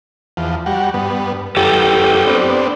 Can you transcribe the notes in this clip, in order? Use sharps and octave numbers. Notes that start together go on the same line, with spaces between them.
E2 F3
G3 F#4
G2 B3
F#2 G4 A4 B4 G5
B3 C4 D4